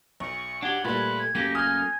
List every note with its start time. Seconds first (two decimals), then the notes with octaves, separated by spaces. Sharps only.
0.20 B1 C#6
0.63 D4 G4 F#5 G#6
0.85 A#2 G3 A3 B4
1.20 G#6
1.35 F#2 A3 A#3 G4 A#6 D#7
1.55 G#5 D#6 F6 G6